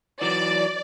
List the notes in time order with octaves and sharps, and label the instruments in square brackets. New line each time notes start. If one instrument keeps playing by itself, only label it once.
[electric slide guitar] E3 F#3 [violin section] D5